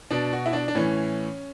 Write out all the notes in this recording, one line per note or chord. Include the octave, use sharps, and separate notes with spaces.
B2 D4
F#4
E4
D4
D4
A2 E3 C#4